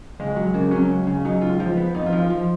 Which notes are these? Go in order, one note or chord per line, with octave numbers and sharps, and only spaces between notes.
C#2 G#3
F#3
C#3 A#3
F#3 C#4
C#2
C#3
F#3 D#4
C#2 F4
F3 F4
B3
F2 D#4
F4
F3
F4
F3